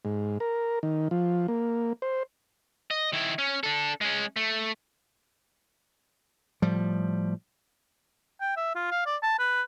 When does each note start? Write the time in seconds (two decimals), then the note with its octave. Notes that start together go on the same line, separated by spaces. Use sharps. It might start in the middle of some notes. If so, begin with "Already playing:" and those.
0.05 G#2
0.40 A#4
0.83 D#3
1.11 F3
1.48 A#3
2.02 C5
2.91 D#5
3.13 D#3 E4
3.38 C#4
3.63 D4 A4
4.01 G#3 C#4
4.36 A3
6.62 A2 F3 G3
8.41 G5
8.57 E5
8.75 F4
8.91 F5
9.06 D5
9.23 A5
9.39 B4